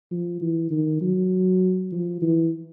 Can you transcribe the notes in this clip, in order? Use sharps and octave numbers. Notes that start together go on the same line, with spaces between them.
F3
E3
D#3
F#3
F3
E3